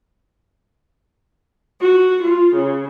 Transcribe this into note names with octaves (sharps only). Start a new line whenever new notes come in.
F#4
F4
C#3